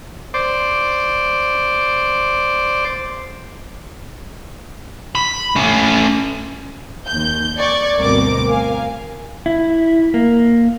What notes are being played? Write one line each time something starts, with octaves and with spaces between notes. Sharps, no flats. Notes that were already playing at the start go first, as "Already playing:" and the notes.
C5 D5
B5
A3 C#4
D#2 G6
D5 C#6 G#6
D2 G2 B2 C4 A#4 D6
A#4 F5 G#5
E4
A#3